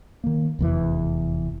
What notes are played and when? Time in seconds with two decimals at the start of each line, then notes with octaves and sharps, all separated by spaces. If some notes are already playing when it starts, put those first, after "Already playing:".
0.24 D#3 A#3
0.59 F1 E2 E3